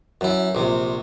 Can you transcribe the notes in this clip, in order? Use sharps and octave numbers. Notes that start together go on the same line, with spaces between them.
F#2 E4
A#1 C3